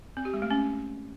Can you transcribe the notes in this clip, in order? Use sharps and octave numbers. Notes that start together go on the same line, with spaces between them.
C4
G4
G#3
A3
C#4